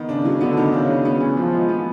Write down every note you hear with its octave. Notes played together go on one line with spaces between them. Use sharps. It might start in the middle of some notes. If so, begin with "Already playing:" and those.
Already playing: D#3 B3
C#3 D4
F#3
D3 B3
D#3
C#3 D4
F#3
C#3 B3
E3
E3 F3
G#3
B3